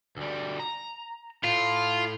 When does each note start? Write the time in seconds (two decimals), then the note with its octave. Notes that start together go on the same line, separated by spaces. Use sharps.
0.16 D2 G3
0.60 A#5
1.44 A2 F4